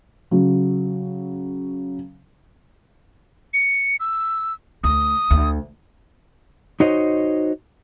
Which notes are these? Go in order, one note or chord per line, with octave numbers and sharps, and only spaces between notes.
C#3 F#3
C#7
E6
D2 D#6
D2
D#4 F#4 C5 C#5 D#5